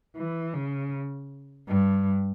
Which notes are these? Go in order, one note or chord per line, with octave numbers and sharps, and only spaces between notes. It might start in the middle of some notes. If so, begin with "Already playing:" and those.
E3
C#3
G2